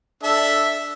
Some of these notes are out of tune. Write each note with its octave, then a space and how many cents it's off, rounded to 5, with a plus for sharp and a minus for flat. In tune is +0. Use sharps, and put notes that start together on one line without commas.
D4 +0 A4 +0 E5 +0